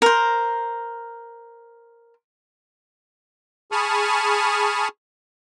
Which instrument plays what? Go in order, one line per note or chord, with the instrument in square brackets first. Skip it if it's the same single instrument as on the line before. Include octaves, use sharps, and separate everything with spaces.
[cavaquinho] A#4 C5
[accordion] G#4 A5 B5 C#6 D#6 F6